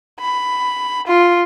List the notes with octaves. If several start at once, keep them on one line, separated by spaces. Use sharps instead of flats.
B5
F4